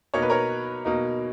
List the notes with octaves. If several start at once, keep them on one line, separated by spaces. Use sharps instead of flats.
B2 A#3 D#4 C#5
B4
A#4 C#5
B2 A#3 D#4